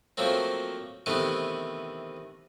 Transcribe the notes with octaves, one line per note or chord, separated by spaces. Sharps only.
F3 F#3 A3 A#3 C4
C3 D#3 E3 A3 B3